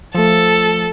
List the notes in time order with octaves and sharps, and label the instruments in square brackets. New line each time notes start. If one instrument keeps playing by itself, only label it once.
[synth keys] F3 A3 [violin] A4